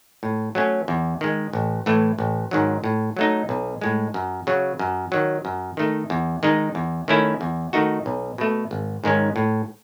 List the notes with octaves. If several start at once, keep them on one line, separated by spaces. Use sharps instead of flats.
A2
F#3 A3 C#4
E2
D#3 G#3
A1
A2 E3 A3
A1
G#2 D#3 F#3
A2
F#3 A3 D#4
B1
A2 G#3
F#2
C#3 F#3
F#2
D#3 F#3
F#2
D#3 A3 D#4
E2
D#3 G#3 D#4
E2
D#3 A3 C#4 E4
E2
D#3 A3 D#4 F#4
B1
B2 A3
G#1
G#2 D#3 G#3 C#4
A2